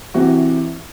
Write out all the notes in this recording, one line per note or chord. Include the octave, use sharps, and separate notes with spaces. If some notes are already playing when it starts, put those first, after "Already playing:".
C3 E3 C4 F#4